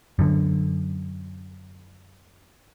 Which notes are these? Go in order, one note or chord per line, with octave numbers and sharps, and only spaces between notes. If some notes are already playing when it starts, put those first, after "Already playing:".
F#2 D3